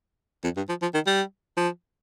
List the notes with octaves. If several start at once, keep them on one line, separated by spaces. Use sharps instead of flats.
F2
G2
F3
F3
D#3
G3
F3